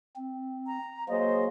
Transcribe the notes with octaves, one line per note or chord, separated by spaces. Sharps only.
C4
A#5
F#3 A#3 G#4 C5 D#5